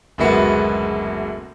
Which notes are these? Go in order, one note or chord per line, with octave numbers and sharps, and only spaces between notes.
F#1 D2 B2 G#3 B3 F#4